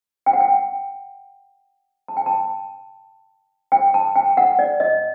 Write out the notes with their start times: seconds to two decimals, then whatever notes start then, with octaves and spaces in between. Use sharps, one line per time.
0.26 G5
0.33 F#5
0.40 G5
2.08 A5
2.17 G5
2.26 A5
3.72 G5
3.94 A5
4.15 G5
4.37 F#5
4.59 D5
4.80 D#5